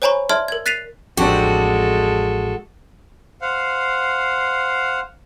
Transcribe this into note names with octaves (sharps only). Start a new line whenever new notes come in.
C5 C#5 G#5 A#5 B5 C#6
D5 E5 A5 C6 F6 G#6
A#4 G#6
F#6 A6 B6 C7 D#7 F7
A1 F2 G#3 C4 D4 F#4 G4 A4
C5 F5 F#5